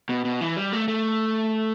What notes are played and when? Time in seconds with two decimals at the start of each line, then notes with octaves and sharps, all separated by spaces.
0.09 B2
0.25 B2
0.41 E3
0.57 G3
0.73 A3
0.88 A3